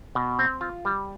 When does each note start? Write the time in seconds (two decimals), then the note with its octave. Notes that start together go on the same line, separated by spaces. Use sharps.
0.15 B2
0.39 C4
0.61 F4
0.85 G3